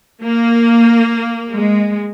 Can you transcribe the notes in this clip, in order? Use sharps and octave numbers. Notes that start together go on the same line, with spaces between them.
A#3
G#3